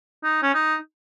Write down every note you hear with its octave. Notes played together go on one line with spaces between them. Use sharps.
D#4
C#4
D#4